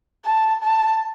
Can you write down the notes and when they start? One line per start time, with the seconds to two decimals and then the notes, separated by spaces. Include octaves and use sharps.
0.25 A5
0.63 A5